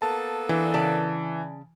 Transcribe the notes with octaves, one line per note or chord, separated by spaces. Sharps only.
A#3 B3 A4 A5
E3 D4
C#3 D5 A5